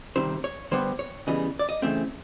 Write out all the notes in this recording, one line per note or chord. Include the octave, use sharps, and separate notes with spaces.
C3 D#3 G3 C5
C#5
D3 G3 B3 C5
C#5
C#3 E3 G3 B3 D#5
D5
D#5
C#3 E3 A3 C4 E5